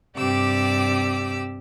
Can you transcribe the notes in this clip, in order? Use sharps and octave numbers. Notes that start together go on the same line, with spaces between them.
G2 C3 G4 D5 D6 E6